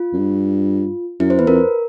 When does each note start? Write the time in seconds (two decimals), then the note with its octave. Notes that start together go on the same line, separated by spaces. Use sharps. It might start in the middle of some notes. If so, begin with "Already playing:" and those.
Already playing: F4
0.13 F#2
0.19 G2
1.20 F#2 E4
1.30 C5
1.39 E2 B4
1.47 F2 A#4